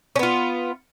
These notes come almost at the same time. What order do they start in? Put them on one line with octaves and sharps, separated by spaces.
C#4 B3 F4